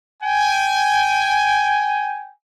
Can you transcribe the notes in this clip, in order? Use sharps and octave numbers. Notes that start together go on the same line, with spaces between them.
G5 G#5